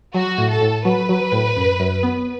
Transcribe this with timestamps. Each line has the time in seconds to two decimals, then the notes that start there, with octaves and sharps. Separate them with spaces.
0.14 F#3 F#4
0.38 A2
0.50 A4
0.61 A2
0.85 F#3 B4
1.09 F#3
1.32 A2
1.57 F#2
1.80 F#2
2.03 B3